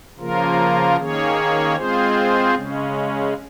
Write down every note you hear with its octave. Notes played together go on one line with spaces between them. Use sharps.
C#3 F3 A#3 F4 A#4
D#3 A#3 C#4 G#4 C#5
G#3 C4 F4 G#4 C5
C#3 G#3 C#4